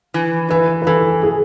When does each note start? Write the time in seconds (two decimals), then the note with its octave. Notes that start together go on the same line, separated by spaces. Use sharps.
0.14 E3
0.50 E3 B4
0.82 B4
0.87 E3 A4
1.23 G#4